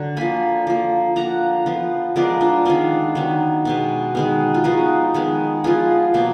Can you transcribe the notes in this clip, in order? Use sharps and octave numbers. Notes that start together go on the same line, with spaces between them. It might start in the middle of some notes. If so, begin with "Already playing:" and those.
Already playing: D3 F#3
F3 A#3 G#5 B5
F3 A#3
F3 A#3 F#5 A#5
F3 B3
F3 G#3 B3 A#4 D5
D4 F4
D#3 G#3 B3 D4 F4
D#3 F#3 B3
B2 G#3 B3
D#3 G#3 B3
F4
F3 G#3 B3 D#4 F#4
D#3 G#3 B3
F3 B3 F4 G#4
B2 F#3 A#3